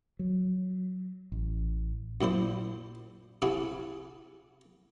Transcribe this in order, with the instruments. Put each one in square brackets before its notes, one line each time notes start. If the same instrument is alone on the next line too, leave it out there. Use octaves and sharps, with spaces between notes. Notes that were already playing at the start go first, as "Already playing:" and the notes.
[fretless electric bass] F#3
A1
[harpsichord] F#2 A#2 E4 C5
C3 F3 E4 F#4 G#4